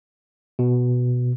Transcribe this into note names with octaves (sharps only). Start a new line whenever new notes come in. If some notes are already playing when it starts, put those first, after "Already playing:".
B2